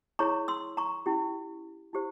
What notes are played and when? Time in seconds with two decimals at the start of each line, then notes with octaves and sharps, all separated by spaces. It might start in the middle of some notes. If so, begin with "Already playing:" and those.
0.19 E4 G#4 C#5 A#5 C#6
0.48 C6 E6
0.77 A#5 C#6
1.06 C#4 E4 G4
1.93 E4 G4 C5